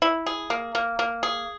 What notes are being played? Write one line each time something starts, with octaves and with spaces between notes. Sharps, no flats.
E4
G#4
A#3
A#3
A#3
G#4